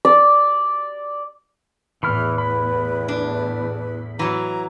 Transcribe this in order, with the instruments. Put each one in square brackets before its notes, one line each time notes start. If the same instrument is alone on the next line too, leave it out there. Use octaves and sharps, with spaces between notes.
[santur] D5
[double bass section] E2 A2 [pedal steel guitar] E3 B5 F6 [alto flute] B4
[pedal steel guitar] B5
[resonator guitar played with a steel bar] D4
[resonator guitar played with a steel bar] E3 F#3 [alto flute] A#5